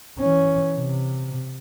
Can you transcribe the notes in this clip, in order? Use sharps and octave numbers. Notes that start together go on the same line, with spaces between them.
E3 C#4
C3